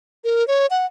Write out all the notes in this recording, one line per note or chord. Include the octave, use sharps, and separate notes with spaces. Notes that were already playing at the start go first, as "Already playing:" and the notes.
A#4
C#5
F#5